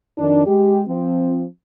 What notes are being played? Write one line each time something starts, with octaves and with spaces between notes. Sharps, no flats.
F2 D#3 D4
G#3 G4
F3 C4